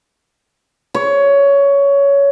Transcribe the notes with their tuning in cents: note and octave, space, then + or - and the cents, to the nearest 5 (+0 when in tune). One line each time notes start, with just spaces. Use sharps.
C#5 +15